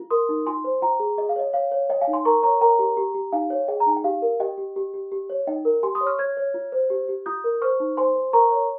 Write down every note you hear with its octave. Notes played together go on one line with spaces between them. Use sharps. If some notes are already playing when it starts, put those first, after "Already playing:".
Already playing: F4
A#4 C6 D#6
D#4
F4 G#5 C6
C5
F4 G5 A#5
G#4
G#4 D#5
F5
C#5 D#5
C#5 F5
C#5
C#5 D#5 G5
F5 G#5
D#4
G#5 C6
A#4 A#5 C#6
C#5 A#5 C#6
A#4 G5 A#5
G4
G4
G4
D#4 F5 G#5
C#5
G#4 D#5 G5
A#5
D#4 G#5
G5
G4 F5
A#4
G4 D#5 G5
G4
G4
G4
G4
C#5
D#4 D#5 G5
A#4
G4 G#5 C6
C6 D#6
C#5
C#6 F6
C#5 F6 G#6
C#5
F4
C5
G4
G4
F4 D#6 G6
A#4
C5 C#6 F6
D#4
C5 G#5 C6
C5
A#4 A#5 C#6
C#5